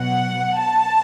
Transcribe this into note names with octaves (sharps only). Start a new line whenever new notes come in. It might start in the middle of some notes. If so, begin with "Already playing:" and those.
Already playing: B2 F#3 F#5
A5